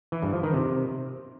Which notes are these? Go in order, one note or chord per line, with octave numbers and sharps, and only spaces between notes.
E3
G2
F3
D#3
C3